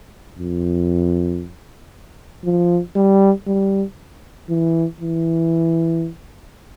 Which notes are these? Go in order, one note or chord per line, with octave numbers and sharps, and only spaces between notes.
F2
F3
G3
G3
E3
E3